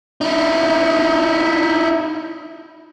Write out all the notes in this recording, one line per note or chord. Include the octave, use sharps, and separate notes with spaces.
D#4 E4